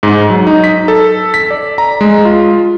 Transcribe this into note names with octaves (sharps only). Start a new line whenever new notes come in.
G#2
F#3
D#4
B6
A4
B6
D5
A#5
G#3
F4